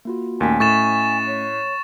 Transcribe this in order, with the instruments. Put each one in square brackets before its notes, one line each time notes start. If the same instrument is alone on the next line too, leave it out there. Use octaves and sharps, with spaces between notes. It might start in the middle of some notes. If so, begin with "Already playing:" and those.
[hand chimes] A#3 F4 F#4
[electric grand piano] D#2 A#2 [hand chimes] A3 C#4 B6 [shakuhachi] G#5
[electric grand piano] A2 [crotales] C#6 A6 E7
[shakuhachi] C#5